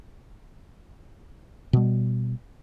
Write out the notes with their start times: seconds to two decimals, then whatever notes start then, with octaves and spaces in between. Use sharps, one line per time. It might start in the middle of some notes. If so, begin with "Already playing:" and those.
1.73 B2 G3